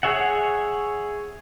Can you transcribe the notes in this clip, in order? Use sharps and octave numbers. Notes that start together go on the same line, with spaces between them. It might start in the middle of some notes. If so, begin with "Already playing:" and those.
G#4 C#5 E5 F#5